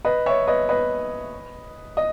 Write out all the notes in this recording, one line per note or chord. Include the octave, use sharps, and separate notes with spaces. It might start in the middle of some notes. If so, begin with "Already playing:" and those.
B4 D#5
C#5 E5
B4 D#5
B4 D#5
D#5